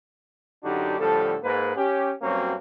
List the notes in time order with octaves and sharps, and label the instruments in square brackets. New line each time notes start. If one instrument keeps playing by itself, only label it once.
[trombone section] F#2 D3 D4 D#4 F#4 G4
A2 D3 F3 G3 A4
G#2 A#3 B4
C#4 G4
G2 F#3 A#3 C4 C#4 F#4